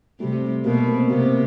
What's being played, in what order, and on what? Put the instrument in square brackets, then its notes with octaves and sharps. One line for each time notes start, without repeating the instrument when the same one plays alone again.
[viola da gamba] C3 [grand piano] G3 A3
[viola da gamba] B2 [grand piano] A#3 C4
[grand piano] A#3 C4
[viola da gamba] C3 [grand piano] A#3 C4